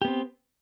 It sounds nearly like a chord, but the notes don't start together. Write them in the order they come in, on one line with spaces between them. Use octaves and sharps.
G4 B3 C4